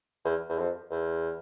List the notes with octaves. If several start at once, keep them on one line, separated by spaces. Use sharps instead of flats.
E2
E2
F2
E2